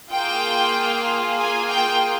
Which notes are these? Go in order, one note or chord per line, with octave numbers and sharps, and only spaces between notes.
A#3 F4 G#4 G5
G#5
G5